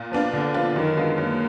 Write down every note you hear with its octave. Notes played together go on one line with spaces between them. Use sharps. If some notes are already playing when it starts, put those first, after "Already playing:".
Already playing: A#2
F3 B3 D4 F4
A#2 D3
F3 B3 D4 F4
F#2 D#3
D3 G#3 B3 F4
F#2 A#3